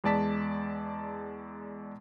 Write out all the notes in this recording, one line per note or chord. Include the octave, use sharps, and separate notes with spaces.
E2 G#3 D5 A5 B6